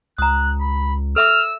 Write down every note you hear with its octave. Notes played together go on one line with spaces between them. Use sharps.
C#2 A#5 D#6 F#6
B5
A4 E5 D6 E6 F6